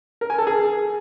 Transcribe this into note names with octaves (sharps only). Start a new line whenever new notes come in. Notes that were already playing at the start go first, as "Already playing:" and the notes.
A#4
G#5
A4
G#4